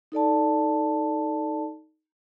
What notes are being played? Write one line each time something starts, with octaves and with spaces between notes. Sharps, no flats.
D#4 A4 D5 A5